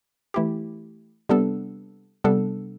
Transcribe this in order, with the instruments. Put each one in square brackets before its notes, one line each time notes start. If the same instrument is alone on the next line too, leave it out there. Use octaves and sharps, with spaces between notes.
[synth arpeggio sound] E3 A3 E4 G4
C3 G3 B3 D4 A4
C3 G3 B3 D4 A4